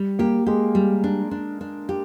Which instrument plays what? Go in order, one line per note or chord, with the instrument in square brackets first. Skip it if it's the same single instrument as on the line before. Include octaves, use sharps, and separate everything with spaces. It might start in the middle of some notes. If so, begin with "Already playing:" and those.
Already playing: [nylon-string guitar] G3
[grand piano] A#3 [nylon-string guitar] G4
[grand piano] G#3 [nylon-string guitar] G4
[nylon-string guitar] G3
D4
D4
D4
G4